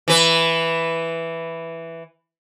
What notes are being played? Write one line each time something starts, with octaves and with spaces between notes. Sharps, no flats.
E3 B4